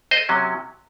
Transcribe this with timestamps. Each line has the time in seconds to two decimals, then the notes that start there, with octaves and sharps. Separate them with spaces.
0.11 C5 D#5
0.29 C3 F#3 C#4